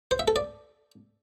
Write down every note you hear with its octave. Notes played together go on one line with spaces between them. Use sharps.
C5
E5
A4
D5